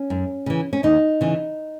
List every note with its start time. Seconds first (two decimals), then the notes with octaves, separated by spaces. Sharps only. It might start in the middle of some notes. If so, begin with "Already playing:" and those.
Already playing: C#4
0.10 F#2
0.46 C#3 E3
0.73 C#4
0.83 D#2 D#4
1.21 C#3 E3